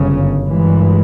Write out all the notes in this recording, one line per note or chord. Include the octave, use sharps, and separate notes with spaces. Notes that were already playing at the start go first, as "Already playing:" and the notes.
Already playing: G1 F#2 C#3
G2 E3 G#3